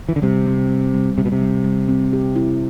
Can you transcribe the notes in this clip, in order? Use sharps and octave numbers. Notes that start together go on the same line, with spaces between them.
E3
D3
C3 G3
C4
G3
G3
C3 G3
B2
C3
G3
G3
C4
G4
E4